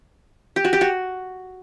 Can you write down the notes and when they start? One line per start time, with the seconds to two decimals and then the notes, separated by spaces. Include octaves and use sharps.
0.56 G4
0.65 F#4
0.73 G4
0.81 F#4